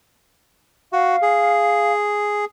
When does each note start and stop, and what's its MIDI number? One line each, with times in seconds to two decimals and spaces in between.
0.93 1.16 66
0.93 1.92 77
1.22 2.45 68